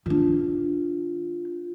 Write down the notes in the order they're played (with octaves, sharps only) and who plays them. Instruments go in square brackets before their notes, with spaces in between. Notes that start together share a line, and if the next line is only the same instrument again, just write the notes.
[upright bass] D#3 D4 [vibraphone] F4